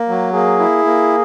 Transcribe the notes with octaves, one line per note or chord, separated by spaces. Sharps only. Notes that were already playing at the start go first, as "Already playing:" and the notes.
Already playing: A#3
F#3
A#3 G#4
E4
A#3